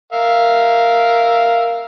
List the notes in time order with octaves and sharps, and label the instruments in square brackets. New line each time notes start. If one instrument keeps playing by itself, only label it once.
[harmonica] A#4 E5 F5